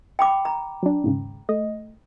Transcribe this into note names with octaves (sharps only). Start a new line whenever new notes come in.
G5 B5 D6
A#5
F#3 D4
D#2 G#2 C#3
A3 D#5